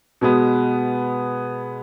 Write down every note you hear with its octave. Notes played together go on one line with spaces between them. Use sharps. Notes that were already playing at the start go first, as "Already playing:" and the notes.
B2 G#3 B3